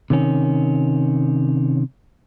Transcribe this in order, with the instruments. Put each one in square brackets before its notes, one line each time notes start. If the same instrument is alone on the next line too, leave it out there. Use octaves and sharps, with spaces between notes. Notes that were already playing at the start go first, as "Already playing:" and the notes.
[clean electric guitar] C3 D#3 C#4